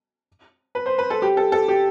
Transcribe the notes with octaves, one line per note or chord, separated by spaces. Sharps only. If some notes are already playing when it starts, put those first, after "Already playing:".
B4
C5
B4
A4
G4
A4
A4
G4